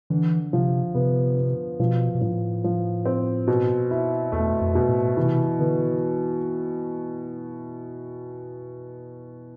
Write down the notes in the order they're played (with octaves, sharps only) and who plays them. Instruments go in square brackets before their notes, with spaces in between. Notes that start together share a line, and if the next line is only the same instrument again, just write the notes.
[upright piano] D3 [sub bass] E3
[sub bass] C3 [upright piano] F3
[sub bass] C3 [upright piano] B3
[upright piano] B3
[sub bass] B2 [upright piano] F3
[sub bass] B2
[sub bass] A2 [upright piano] F3
[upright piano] F3
C4
B2
E4
[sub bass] E2 [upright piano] A3
[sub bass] F2
[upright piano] B2
[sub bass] A2
[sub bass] C3 [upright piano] E3
[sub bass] D3 [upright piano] B3